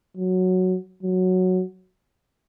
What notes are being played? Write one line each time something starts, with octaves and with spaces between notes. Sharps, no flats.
F#3
F#3